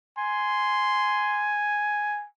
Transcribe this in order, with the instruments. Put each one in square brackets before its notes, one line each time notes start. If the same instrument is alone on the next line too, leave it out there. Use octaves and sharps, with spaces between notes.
[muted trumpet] G#5 [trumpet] C6